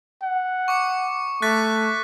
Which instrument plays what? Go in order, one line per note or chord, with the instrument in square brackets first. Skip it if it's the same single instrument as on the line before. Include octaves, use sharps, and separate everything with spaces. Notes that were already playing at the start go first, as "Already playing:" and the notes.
[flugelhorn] F#5
[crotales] C#6 D6 C#7
[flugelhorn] A3 [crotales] F#6 A6 B6